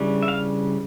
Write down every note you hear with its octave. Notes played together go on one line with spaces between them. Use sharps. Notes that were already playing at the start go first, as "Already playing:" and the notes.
Already playing: C#3 E3 G3 D4
E5
F5